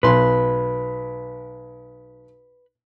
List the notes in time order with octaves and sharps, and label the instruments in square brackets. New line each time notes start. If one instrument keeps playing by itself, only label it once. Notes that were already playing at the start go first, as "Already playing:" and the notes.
[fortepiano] B1 C6 [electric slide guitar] B4